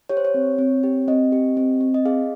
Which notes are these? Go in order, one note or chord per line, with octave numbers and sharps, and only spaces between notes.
G4 C#5
C5
C#5
C4
C4
G4
C4 D#5
G4
C4
C4
D#5
G#4 F5